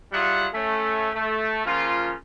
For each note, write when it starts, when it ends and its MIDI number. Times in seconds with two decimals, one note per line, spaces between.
0.12 0.48 54
0.12 0.48 55
0.12 0.48 65
0.12 0.48 68
0.12 0.48 76
0.12 0.48 78
0.54 1.09 57
0.54 1.09 61
1.14 1.62 57
1.65 2.12 49
1.65 2.12 53
1.65 2.12 58
1.65 2.12 65